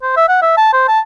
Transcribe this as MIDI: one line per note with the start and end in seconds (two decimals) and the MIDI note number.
0.02 0.12 72
0.17 0.28 76
0.28 0.39 78
0.42 0.54 76
0.57 0.71 81
0.73 0.88 72
0.88 1.00 81